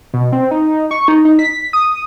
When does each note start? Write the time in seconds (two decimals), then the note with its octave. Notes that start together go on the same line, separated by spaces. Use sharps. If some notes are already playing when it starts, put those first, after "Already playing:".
0.14 B2
0.33 C4
0.51 D#4
0.91 C#6
1.08 D#4
1.25 D#4
1.39 B6
1.73 D#6